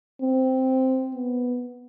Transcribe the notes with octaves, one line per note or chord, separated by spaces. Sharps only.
C4
B3